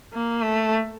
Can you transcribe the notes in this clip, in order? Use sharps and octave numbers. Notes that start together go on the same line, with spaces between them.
A#3
A3